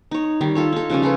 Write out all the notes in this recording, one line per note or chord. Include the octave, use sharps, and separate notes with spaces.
D#4 C#5
D#3 G3
F4 A4 C#5
D#4 A4
C#3 F3 G3 C#4
F4 G#4 A4 B4